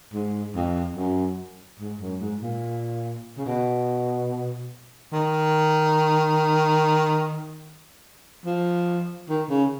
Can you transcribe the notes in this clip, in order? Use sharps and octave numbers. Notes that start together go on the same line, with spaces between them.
G#2
F2
F#2
G#2
F#2
G#2
A#2
C#3
B2
D#3
F3
D#3
C#3